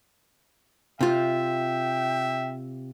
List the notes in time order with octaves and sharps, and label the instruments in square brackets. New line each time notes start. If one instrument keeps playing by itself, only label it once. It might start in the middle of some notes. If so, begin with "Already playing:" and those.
[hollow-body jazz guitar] C3 F4 [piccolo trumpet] E5 [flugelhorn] G5